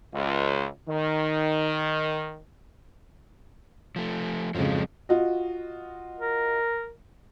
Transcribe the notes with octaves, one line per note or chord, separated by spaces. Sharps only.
C#2
D#3
F3 A3
F2 G#2 C#3 F3 F#3
F4 F#4 D#5
A#4